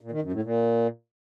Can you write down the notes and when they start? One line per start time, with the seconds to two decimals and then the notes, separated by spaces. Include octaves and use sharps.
0.01 A#2
0.11 D#3
0.22 F#2
0.32 A2
0.43 A#2